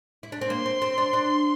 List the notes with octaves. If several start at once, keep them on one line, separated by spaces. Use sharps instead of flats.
E4
D4
C4
A#3 C6
C4
C4
D4
D4